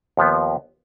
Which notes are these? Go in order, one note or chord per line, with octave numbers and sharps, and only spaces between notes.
D#2 F3 B3